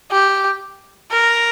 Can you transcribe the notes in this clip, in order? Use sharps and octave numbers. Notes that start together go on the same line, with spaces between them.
G4
A#4